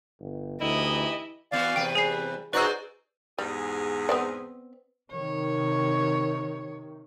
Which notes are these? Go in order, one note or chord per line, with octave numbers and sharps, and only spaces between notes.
G1
D2 E3 D#4 E4 G4 D#5
E3 B3 F#4 D5 F5
E2 C3 B4 G5
G3 G#4 G#5 C7
D#4 F#4 G#4 B4 C5 D5 E6 F#6
E2 G#2 G3 G#4
B3 C4 D5
C3 D#3 C#5